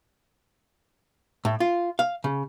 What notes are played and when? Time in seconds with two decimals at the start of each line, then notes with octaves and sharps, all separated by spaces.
1.45 A2
1.60 F4
1.99 F5
2.24 C#3